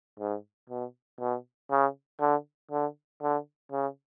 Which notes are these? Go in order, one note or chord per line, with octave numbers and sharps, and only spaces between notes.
G#2
B2
B2
C#3
D3
D3
D3
C#3